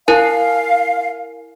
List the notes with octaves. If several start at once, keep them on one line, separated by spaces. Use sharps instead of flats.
E4 A#4 F5 G#5